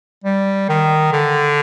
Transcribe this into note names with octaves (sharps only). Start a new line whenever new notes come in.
G3
D#3
D3